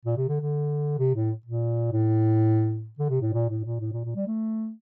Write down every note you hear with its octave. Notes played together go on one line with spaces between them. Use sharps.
A#2
C3
D3
D3
C3
A2
A#2
A2
D3
C3
A2
A#2
A2
A#2
A2
A#2
A#2
G3
A3